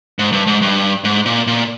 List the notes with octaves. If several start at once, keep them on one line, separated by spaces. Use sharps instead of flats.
G#2
G2
G#2
G2
G#2
A#2
A#2